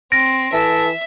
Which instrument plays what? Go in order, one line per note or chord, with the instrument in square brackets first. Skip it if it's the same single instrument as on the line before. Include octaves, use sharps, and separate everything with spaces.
[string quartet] C4 [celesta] A#6 D7
[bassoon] E3 [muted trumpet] A4 [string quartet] E5